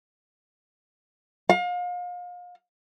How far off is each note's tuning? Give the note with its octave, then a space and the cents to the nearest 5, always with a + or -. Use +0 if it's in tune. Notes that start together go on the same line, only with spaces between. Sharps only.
F5 +35